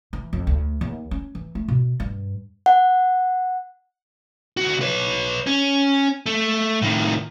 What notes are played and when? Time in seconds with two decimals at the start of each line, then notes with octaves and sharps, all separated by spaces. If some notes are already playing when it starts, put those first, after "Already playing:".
0.13 E3
0.33 F2
0.47 D2
0.81 D#2
1.11 C#4
1.35 E3
1.55 A3
1.68 B2
2.00 G2
2.66 F#5
4.57 D2 F#4
4.81 B4 C#5
5.47 C#4
6.26 A3
6.82 A2 D#3